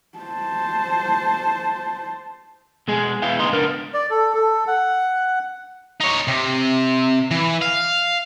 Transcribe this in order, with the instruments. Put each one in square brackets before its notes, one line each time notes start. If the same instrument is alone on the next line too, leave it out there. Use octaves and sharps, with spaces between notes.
[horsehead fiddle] C5 A5
[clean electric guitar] B2 G#3 G#4
B3 E4 F5 G5
D2 D#4 D#5 C6
C#2 B3 D4 A#4
[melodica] D5
A4
A4
F#5
[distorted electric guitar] D#4 C#5
C3
E3
F5